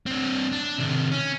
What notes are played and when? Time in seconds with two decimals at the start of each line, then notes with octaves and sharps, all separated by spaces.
0.06 C4 D4
0.52 D4
0.78 C3 D#3
1.11 C#4